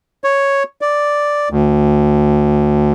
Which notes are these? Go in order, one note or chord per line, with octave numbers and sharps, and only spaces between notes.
C#5
D5
D2